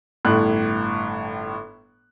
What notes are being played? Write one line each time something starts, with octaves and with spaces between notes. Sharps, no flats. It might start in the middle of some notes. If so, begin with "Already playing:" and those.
G1 A2 F#6